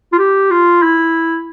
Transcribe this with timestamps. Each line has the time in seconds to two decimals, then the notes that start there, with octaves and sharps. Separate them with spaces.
0.12 F4
0.18 G4
0.50 F4
0.82 E4